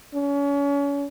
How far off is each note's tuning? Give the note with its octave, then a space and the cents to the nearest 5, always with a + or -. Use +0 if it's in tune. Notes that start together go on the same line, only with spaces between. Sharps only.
C#4 +35